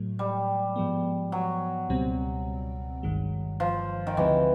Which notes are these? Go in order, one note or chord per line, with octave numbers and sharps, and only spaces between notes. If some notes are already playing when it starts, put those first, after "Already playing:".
Already playing: A2 F#3 A3
G3
G#2 F3 G#3 B3
F#3
C#2 B2 G3 C4
G1 G2 D#3 G#3
F3
D#3
D2 D3 E3 F3 G#3 C4